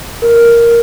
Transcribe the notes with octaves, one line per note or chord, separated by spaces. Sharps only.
A#4